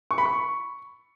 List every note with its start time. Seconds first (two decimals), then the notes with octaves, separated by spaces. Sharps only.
0.11 C#6
0.18 B5
0.25 C#6